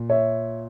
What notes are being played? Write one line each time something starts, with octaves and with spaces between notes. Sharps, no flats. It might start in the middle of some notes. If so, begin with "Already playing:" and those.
Already playing: A#2
C#5 E5